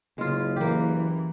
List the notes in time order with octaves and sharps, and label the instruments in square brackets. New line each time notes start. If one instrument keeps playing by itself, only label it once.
[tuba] F#1 [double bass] C#3 [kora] G#3 F4
[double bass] E3 [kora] A#3 G4